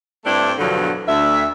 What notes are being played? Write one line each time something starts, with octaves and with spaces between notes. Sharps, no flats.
G2 A3 C4 D4 E4 G4
E2 G2 B2 D3 F3 F#3
D2 E5